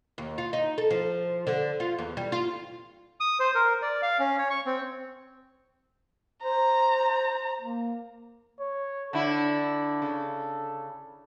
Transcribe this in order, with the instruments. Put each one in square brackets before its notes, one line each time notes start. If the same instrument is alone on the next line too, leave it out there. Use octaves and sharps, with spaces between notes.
[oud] D#2
F4
D#4
A4
F3
D3
F4
E2
G3
F4
[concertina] D#6
C5
A#4
D5
F5
C#4
C#5
C#6
C4
[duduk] C5 [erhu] A#5
[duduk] A#3
[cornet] C#5
[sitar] D3 E4 [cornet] A4
[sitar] C#3